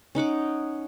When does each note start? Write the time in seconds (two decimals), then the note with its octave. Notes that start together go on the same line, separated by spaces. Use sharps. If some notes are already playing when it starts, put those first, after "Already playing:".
0.15 C#4 D#4 F#5 D6